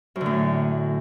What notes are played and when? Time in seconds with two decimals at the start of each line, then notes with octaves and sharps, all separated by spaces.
0.16 F#2
0.21 D3
0.26 A2